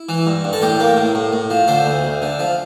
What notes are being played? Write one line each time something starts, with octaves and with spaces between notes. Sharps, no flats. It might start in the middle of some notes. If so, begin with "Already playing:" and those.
Already playing: E4
E3
G2
G2
A4
A2 G4
A#3
A2
A2
A2
F3
D3 C5
D2
D2
D3
F3